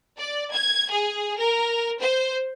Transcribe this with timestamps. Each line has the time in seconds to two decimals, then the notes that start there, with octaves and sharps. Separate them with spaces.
0.19 D5
0.53 G#6
0.92 G#4
1.38 A#4
2.00 C5